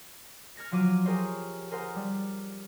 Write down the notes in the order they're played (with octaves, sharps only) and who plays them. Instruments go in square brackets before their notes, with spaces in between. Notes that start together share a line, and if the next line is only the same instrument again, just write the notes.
[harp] F6 G#6 A#6 C#7
F3 F#3 D6 F6 D#7
G4 G#4 A#4 C5 C#5
G#4 A#4 C5 F#5
G3